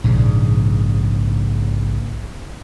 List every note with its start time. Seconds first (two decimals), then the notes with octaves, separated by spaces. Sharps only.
0.04 A#1 G#2 C#3